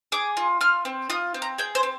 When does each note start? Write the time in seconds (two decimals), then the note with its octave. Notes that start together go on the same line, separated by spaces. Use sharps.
0.12 G#4 D6
0.37 F4
0.61 F4 F6
0.85 C4
1.10 F4 D#6
1.34 C4
1.42 A#5
1.58 G#4 G5
1.75 C5
1.83 C4